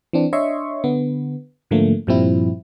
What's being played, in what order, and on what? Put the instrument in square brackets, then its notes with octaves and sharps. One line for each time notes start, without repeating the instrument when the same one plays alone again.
[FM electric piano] E3 C4 D4
D4 C#5 D#5 E5 C6 C#6
D3 B3
G#2 D3 F3 A3 A#3
G2 A#2 F3 G3 C4 E4